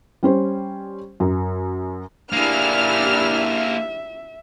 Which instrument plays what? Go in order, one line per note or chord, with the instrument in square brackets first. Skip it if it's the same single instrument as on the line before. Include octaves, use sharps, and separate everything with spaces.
[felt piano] G3 C#4 C5
F#2
[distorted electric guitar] A#3 G#4 [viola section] D4 E4 G4 [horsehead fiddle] E5 [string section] F6